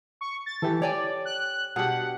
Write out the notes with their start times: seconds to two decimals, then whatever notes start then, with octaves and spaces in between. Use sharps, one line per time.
0.21 C#6
0.46 A6
0.62 E3 G4 A4
0.82 C#5 D5 G5 G#5
1.25 F#6
1.76 B2 D4 G4 G#4 F#5